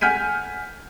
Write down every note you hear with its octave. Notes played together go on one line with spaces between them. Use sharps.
F#5 G#5 F6 G6 B6 D#7